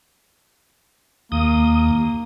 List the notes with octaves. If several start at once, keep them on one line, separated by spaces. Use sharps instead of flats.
D#2 A#3 D#6